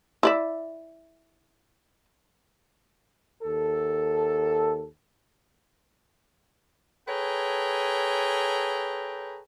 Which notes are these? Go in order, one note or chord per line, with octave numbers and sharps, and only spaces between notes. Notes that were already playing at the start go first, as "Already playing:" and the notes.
E4 D5 E5
D#2 A4
G#4 A4 B4 C#5 G5 A#5